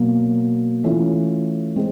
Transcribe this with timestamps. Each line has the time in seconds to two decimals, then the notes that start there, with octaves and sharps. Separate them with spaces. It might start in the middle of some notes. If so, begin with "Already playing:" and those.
Already playing: B2 F#3 A#3
0.84 E3 A3 C#4 F4
1.76 G#3 C4